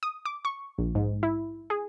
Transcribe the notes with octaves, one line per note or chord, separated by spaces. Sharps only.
D#6
D6
C#6
A#1
G#2
E4
G#4